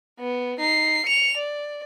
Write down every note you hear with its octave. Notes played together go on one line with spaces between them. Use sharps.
B3
D#4 C7
C#7 F7
D5